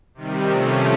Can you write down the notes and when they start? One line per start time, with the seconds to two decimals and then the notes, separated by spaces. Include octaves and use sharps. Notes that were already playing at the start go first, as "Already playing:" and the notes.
0.14 C3 D#3 G3
0.51 C3 F3 A3 C#4